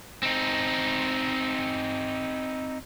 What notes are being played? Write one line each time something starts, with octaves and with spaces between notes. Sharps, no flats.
C4 D#4